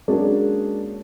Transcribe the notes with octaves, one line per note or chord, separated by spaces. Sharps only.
G#3 A#3 C#4 D4 F#4 G#4